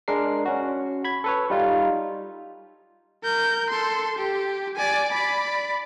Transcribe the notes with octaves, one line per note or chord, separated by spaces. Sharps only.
G#3 D4 A#4 C7
C#4 F#4
B5 G#6
A4 B4 C#5
G3 D#4 F4
A#4 G6
A4 C6
G4
D5 G#5
D5 B5